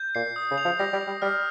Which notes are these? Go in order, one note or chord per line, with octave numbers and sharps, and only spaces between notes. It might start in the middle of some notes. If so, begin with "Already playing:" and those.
Already playing: G6
A#2 C7
D#6
C#3
F7
F3
G3 A#6
G3
F7
G3
G3 F6